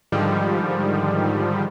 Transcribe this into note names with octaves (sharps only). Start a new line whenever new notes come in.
G#2 D3 D#3 F3 G3